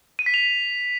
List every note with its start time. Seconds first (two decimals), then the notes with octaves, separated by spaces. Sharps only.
0.19 D#7
0.26 B6
0.34 F7